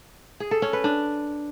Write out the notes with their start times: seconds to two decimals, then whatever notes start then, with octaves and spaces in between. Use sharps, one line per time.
0.40 G#4
0.51 A4
0.62 C#4
0.73 B4
0.84 D4